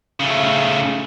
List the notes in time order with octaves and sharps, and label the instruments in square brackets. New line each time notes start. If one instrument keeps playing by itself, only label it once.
[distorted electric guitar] C#3 A3